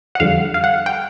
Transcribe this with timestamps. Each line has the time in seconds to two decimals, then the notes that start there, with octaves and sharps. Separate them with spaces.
0.15 F#5
0.20 F2 D3 G3 F5
0.54 F5
0.64 F#5
0.86 G5